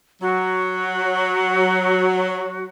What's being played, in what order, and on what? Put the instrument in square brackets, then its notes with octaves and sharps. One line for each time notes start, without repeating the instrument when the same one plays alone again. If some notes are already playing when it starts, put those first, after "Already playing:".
[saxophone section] F#3 [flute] F#4